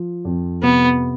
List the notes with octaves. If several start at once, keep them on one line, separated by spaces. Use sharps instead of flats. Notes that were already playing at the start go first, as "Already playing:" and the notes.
Already playing: F3
F2
C3 B3